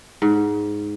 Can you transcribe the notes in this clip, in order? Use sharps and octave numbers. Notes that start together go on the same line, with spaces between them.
G#2